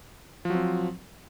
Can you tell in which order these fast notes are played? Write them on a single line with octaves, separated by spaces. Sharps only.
F3 F#3 C4